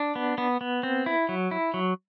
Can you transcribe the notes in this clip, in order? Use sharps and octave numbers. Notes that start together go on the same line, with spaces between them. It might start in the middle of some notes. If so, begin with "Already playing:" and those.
Already playing: D4
B3
B3
B3
C4
E4
F#3
E4
F#3